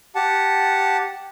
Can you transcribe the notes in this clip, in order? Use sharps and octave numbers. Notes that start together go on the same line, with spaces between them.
G4 F#5 A5